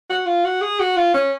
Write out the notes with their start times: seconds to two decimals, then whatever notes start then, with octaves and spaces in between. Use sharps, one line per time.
0.10 F#4
0.26 F4
0.45 F#4
0.62 G#4
0.80 F#4
0.97 F4
1.14 C#4